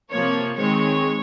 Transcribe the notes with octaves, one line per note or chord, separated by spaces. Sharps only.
C3 F3 A#3 C#5
D#3 G#3 C4 C#5